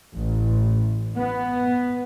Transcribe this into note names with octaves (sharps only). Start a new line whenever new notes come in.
A1
B3